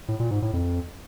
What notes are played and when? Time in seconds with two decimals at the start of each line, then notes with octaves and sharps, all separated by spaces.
0.08 A2
0.20 A#2
0.31 G#2
0.42 A2
0.53 F2